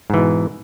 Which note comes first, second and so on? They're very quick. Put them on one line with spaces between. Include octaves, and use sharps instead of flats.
G#2 E3 B2